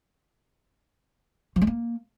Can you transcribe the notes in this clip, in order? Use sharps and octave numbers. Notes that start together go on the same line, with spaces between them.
F3
G#3
A#3